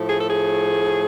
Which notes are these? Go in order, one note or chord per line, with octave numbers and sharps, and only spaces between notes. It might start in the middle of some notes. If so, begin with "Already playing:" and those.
Already playing: A2 F3 A3
G#4
A4
G#4